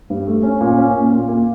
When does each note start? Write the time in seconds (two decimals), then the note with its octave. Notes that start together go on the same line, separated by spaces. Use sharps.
0.10 G2
0.27 A3
0.43 C#4
0.61 A#2
0.78 C#4
0.95 A#2
1.12 A#2
1.28 A#3